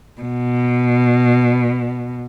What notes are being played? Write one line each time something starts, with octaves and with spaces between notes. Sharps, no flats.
B2